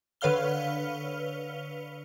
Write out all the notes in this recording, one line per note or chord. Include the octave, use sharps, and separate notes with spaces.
D3 B4 C#5 F5 F6 G7